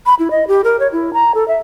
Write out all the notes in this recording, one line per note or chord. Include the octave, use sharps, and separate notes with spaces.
B5
E4
D#5
G4
A#4
C#5
E4
A#5
A4
E5